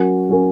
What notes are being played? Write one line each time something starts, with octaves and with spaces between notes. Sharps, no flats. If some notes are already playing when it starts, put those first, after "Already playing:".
Already playing: F#3 C#4 A#4
F#3 C#4 A#4